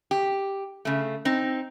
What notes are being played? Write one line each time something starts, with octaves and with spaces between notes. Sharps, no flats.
G4
C#3 A3
C4 D#4